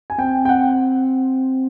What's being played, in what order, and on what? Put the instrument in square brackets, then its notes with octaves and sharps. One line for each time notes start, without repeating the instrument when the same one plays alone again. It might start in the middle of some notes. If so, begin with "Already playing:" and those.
[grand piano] G#5
[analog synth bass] C4 [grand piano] G5
[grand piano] G5
F#5